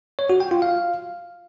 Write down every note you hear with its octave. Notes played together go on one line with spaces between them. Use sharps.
C#5
F#4
G5
F4
F5